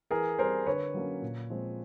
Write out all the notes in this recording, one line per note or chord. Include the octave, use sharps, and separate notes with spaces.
E3 G#4 A#4
G3 C4 A#4 C5
D3 B4 C#5
F#3 A#3 C#4
A#2
F3 G#3 C4